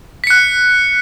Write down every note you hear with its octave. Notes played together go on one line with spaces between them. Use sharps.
F#6 B6 C#7